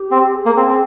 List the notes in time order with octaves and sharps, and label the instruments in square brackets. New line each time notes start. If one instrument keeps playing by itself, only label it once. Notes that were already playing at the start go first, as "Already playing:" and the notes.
Already playing: [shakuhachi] G4
[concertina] C4
[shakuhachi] G#4
[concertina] A#3
C4
C4